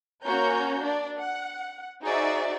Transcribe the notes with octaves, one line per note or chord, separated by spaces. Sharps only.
A#3 C#4 F#4 C#5 A#5 G6
D4 D5
F#5
D#4 F#4 G#4 C5 D5 E5